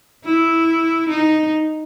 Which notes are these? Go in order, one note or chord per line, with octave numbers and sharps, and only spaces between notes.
E4
D#4